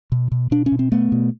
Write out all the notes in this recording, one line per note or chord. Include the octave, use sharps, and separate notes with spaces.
B2
B2
B2 D4
C#4
B2
C4
B2 A3 B3
B2